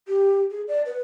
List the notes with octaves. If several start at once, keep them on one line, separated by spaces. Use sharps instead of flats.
G4
G#4
D5
B4